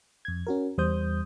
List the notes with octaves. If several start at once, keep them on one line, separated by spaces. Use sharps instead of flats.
F2 G#6
C#4 F#4 A#4
E2 G3 C5 D#6 G6